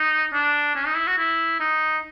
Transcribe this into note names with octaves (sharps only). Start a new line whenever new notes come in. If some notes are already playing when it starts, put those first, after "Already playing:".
Already playing: D#4
D4
C#4
D#4
E4
F#4
E4
D#4